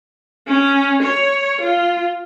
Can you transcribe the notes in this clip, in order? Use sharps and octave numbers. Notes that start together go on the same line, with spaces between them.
C#4
C#5
F4